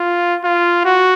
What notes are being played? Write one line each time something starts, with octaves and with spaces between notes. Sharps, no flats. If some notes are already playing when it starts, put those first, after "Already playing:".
Already playing: F4
F4
F#4